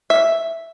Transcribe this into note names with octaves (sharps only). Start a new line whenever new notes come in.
E5